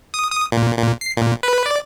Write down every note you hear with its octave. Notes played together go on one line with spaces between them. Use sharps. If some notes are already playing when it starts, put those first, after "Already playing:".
D#6
D#6
A#2
A#2
C7
A#2
B4
D5